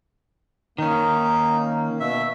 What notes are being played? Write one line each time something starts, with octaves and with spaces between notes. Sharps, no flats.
D#3 A#3 C#4 D#4
B2 E5